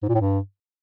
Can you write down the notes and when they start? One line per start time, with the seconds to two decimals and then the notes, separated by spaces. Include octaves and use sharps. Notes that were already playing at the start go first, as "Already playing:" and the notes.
0.03 G#2
0.09 A#2
0.15 A2
0.20 G2